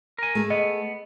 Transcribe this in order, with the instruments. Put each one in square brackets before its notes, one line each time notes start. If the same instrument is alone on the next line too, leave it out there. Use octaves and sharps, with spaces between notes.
[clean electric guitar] A#4 G#5
[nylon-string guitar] A3 G#4 A4
[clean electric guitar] B3 [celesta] D#5